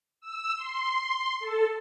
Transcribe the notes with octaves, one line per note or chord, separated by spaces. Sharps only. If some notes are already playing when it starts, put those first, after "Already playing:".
E6
C6
A4